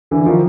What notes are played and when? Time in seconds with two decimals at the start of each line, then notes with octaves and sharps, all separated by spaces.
0.11 D3 E3
0.26 D#3 F3